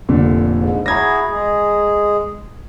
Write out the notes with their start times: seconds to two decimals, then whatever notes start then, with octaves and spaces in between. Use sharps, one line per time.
0.09 F1 A#2 D3
0.52 G#2
0.86 E4 F#4 G#4 A#5 G#6 A#6
1.29 G#3 G#4